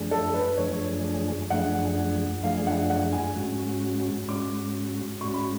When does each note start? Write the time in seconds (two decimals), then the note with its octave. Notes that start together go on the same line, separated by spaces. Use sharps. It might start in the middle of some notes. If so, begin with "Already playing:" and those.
Already playing: F#2 F3 A3 D4 G#4
0.11 A4
0.34 B4
0.57 F#2 F3 A3 D4 G#4 C#5
1.50 F#2 F3 A3 D4 G#4 F#5
2.43 F#2 F3 A3 D4 G#4 F5
2.67 F#5
2.90 F#5
3.13 G#5
3.35 G#2 G#3 C#4 F#4
4.28 G#2 G#3 C#4 F#4 D6
5.21 G#2 G#3 C#4 F#4 C#6
5.34 B5